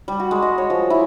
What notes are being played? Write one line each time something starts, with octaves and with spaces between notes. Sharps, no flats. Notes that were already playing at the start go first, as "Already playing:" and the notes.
G3
F#4
G#3
D#5
C#5
F3
E4